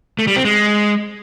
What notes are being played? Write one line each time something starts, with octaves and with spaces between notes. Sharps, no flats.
A3
G3
C4
G#3